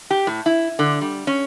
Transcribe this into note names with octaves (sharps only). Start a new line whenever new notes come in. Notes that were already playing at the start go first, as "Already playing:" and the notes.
G4
A2
E4
D3
G3
C#4